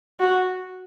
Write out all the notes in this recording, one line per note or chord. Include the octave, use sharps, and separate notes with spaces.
F#4